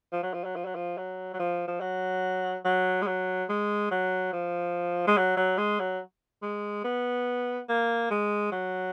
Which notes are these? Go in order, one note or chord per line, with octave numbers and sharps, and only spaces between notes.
F3
F#3
F3
F#3
F3
F#3
F3
F#3
F#3
F3
F3
F#3
F#3
G#3
F#3
G#3
F#3
F3
G#3
F#3
F#3
G#3
F#3
G#3
B3
A#3
G#3
F#3